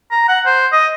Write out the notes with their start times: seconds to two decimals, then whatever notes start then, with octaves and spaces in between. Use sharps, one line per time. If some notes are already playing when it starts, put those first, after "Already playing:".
0.11 A#5
0.28 F#5
0.46 C5
0.72 D#5